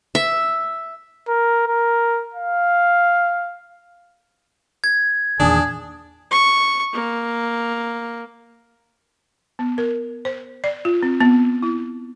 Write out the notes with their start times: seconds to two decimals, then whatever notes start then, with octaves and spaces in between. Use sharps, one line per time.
0.15 E5
1.29 A#4
1.68 A#4
2.34 F5
4.84 G#6
5.40 E2 A#2 D#3 D4 G#4
6.31 C#6
6.93 A#3
9.59 B3
9.78 A#4
10.25 C5
10.64 D5
10.85 F4
11.03 C4
11.20 B3
11.63 E4